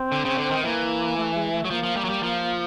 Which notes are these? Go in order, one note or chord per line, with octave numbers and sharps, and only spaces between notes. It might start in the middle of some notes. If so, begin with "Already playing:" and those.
Already playing: C4
D3
C#3
D3
D#3
E3 A#3
A3
G#3
A3
F#3
F3 A#3
F3
G3
F#3
G3
F3